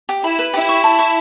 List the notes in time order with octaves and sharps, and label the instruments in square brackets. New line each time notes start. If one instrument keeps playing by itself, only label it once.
[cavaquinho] G4
[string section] E4 [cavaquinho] B5
[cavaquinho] B4
[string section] E4 [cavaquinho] G4
[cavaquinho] C#6
A5
C#6